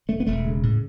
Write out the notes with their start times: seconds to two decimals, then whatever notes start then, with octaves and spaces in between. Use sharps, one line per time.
0.09 E1 A3
0.20 B3
0.27 E1 A3
0.45 C#3
0.63 A2